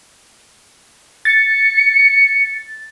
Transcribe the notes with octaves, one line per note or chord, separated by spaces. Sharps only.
A6 C#7